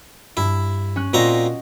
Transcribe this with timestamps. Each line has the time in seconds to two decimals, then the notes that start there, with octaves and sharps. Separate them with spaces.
0.37 G2 E4
0.96 C#4 F#6
1.14 A#2 C4 F#4 D#5 A#5